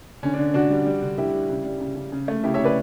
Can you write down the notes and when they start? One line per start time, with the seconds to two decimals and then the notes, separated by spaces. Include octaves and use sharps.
0.23 D3 C#4
0.34 D4
0.38 D3
0.54 D3 D4 F#4
0.70 G3
0.86 G3
1.02 D3
1.17 D3 E4 G4
1.33 G3
1.49 C#3
1.65 G3
1.80 C#3
1.96 C#3
2.12 C#3
2.28 A3
2.43 C#3 E4 G4
2.54 C#5 E5
2.59 C#3
2.64 B4 D5